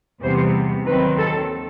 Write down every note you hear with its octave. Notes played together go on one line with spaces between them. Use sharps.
E2 C3 E3 G3 B3 C5
D#2 D#3 F#3 C4 B4
A4